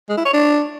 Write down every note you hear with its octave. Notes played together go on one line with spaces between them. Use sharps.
G#3
E4
C#5
D4